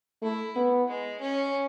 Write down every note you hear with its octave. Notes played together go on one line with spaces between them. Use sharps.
A3 E4
B3
G#3
C#4